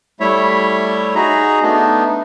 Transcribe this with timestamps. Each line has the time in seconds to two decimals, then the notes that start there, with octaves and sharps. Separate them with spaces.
0.20 G3 A3 E4 C#5 E5
1.15 D#4 F#4 G#4 A#5
1.62 A3 B3 D4 D#4